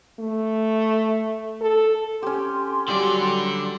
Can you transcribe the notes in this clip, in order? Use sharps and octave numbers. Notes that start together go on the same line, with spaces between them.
A3
A4
C#4 G4 C6
D3 F#3 G3 G4 D5